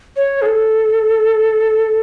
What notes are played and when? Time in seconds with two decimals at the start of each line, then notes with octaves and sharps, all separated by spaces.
0.16 C#5
0.42 G#4
0.46 A4